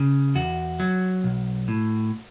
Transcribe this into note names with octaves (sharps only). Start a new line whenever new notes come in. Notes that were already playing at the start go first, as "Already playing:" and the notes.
Already playing: C#3
E2 F#4
F#3
B1
A2